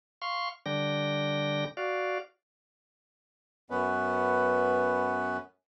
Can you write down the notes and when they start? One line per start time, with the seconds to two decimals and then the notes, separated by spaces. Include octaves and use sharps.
0.22 F5 C6 C#6
0.66 D3 G3 D4 G5 A#6
1.77 F#4 D5 F5
3.70 F#2 B3 C#4 B4